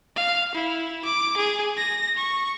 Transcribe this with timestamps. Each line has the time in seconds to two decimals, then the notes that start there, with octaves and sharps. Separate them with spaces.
0.16 F5
0.55 E4
1.05 D6
1.37 G#4
1.76 A#6
2.17 C#6